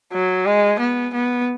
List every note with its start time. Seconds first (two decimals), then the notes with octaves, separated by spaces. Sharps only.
0.13 F#3
0.46 G#3
0.80 B3
1.14 B3